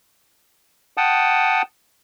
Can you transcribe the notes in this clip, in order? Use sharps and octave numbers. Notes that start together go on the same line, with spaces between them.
F#5 G5 A5 D#6